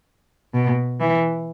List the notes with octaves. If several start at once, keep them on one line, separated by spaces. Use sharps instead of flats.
B2
E3